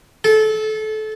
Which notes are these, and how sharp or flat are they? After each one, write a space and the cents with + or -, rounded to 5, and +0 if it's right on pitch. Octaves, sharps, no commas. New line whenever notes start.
A4 -25